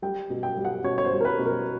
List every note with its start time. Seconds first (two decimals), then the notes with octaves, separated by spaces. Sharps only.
0.02 G3 G5
0.30 B2
0.43 G5
0.57 G3
0.65 F#5
0.84 B2 C#5
0.98 C#5
1.05 C5
1.12 G3
1.21 A#4
1.25 B4
1.39 B2
1.46 A#4